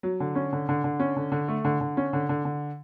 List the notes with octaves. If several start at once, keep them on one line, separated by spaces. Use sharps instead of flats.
F#3
D3
C#4
D3
D3
D3
C#4
D3
D3
A3
D3
D3
C#4
D3
D3
D3